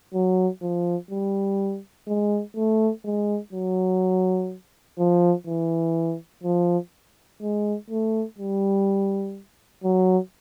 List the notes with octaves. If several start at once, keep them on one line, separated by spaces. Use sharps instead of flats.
F#3
F3
G3
G#3
A3
G#3
F#3
F3
E3
F3
G#3
A3
G3
F#3